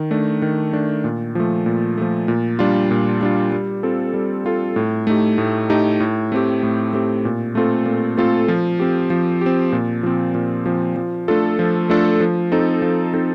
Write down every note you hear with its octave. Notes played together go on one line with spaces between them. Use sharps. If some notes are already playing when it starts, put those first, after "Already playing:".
Already playing: D#3
A3 D4
D#3
A3 D4
A#2
F3 A3
A#2
F3 A3
A#2
G3 D4 F4
A#2
G3 D4 F4
G3
C4 F4 A4
G3
C4 F4 A4
A2
A3 D#4 G4
A2
A3 D#4 G4
A2
A3 C4 G4
A2
A3 C4 G4
A#2
A3 C4 F4 A4
A#2
A3 C4 F4 A4
F3
C4 G4
F3
C4 G4
A#2
F3 C4
A#2
F3 C4
F3
A3 D4 F4 A4
F3
A3 D4 F4 A4
F3
C4 D#4 A4
F3
C4 D#4 A4